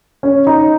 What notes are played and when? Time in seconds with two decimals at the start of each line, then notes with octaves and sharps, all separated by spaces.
0.23 C#4
0.47 D#4